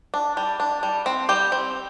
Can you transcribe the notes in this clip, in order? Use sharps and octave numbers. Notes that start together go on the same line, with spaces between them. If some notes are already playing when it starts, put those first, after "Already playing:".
D4
G3
D4
G3
C4
G3 G4
C4